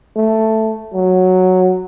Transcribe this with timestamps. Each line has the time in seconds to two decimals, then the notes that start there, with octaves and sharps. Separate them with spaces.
0.16 A3
0.94 F#3